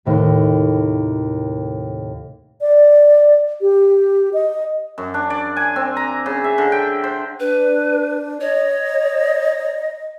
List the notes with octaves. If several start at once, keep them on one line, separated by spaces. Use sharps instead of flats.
D#2 A2 C3
D5
G4
D#5
F#2
D4
D5
G#5
C4
A#5
C#3
E5
D3
G5
C5
D4 B4
C#5 D#5